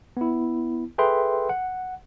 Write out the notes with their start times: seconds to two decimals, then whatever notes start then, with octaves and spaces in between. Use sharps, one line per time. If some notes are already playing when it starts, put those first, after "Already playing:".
0.17 B3 E4
0.98 G#4 A4 B4 E5 G5 C6
1.49 F#5